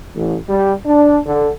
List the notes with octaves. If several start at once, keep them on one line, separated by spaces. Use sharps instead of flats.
A1
G3
D4
D3